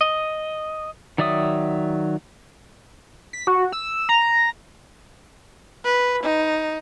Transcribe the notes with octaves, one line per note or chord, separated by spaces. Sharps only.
D#5
D#3 F#3 D5 E5 D#6
B6
F#4
E6
A#5
B4
D#4